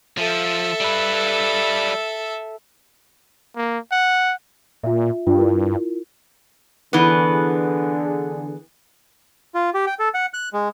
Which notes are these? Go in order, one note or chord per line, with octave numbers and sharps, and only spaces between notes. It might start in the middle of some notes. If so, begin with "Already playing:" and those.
F3 A4 E5
G3 B4
A#3
F#5
A#2 F4 E5
G2 F4 G5
E4 F4 A#4
D3 E3 B3 G#4
F4
G4
G5
A4
F#5
F#6
G#3